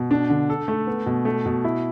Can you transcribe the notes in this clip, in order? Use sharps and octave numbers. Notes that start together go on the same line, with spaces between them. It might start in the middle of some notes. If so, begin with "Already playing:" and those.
Already playing: B2
D4
D3
A4
A3
B3
B2
A3
B2
E4